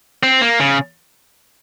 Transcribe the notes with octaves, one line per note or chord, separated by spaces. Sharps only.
C4
A#3
C#3